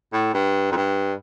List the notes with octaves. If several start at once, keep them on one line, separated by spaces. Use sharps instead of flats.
A2
G2
F2
G2